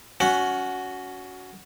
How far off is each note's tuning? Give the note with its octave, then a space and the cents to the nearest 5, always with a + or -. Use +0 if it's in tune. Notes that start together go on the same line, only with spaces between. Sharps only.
C#4 +25 F#4 +0 F#5 +0